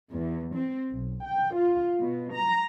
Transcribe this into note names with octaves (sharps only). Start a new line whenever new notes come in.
E2
C4
B1
G5
F4
B2
A#5